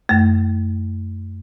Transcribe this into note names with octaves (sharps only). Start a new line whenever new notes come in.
F#2 A3